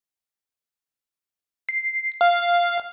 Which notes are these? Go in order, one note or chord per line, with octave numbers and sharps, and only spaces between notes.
C7
F5